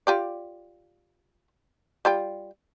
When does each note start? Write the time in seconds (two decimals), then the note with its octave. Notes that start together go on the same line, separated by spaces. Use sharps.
0.07 F4 G4 D5
2.05 G3 F4 G5